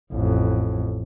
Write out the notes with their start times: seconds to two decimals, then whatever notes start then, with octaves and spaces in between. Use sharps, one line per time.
0.12 A1 F2